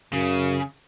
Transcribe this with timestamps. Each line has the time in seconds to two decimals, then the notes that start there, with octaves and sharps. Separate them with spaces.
0.13 F#2 C#3